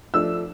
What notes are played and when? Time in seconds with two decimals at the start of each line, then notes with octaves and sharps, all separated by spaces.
0.14 F3 A3 D4 E6